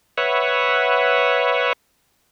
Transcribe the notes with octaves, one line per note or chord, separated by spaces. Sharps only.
B4 C#5 E5 F#5